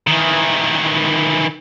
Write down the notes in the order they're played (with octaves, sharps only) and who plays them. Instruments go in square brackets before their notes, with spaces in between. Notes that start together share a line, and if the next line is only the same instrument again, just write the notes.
[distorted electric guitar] D#3 E3